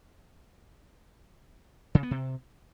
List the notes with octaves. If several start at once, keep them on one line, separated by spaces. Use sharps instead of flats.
C#3
B3
C3